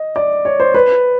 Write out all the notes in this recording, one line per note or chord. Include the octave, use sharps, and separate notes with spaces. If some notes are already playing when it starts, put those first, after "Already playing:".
Already playing: D#5
D5
C#5
C5
B4